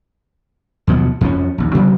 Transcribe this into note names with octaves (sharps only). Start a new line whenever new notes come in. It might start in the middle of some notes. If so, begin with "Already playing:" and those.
D#2 B2 F3 F#3
F2 F3 C#4
A#1 D#2
C3 F#3 G3 C4